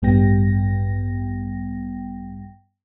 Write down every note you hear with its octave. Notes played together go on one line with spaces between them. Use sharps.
A1 G2 G3 B3 G5 A#6